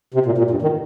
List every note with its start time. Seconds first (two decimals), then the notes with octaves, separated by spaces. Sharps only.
0.14 C3
0.26 A#2
0.38 A#2
0.51 G2
0.62 D#3